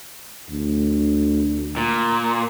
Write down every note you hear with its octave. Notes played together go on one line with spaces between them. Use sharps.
D2
A#2